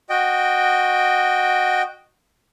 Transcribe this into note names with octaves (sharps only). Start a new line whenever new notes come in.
F#4 D#5 G5